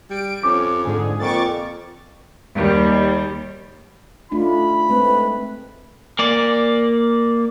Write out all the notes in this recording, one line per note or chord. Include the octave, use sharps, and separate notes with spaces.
G3 D7
F2 C#4 D6
G#2 D3 G#4
F2 A#2 C#6 D6 A6
D#2 G3
A3 D4 D#4 F4 B5
G#3 A3 C4 B4
A#3 D5